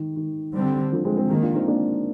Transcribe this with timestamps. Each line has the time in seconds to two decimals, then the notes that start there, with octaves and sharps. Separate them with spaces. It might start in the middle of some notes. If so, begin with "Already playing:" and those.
Already playing: D#3
0.16 D#3
0.54 D3 G3 C4
0.92 D3 F3
1.05 G#3 C4
1.17 G#3 C4
1.30 D#3 F3 G#3 A#3
1.42 D4 F4
1.55 C4 D#4
1.68 A#3 D4